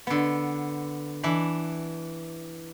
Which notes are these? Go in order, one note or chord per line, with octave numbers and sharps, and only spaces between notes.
D3 B3
E3 D4 B5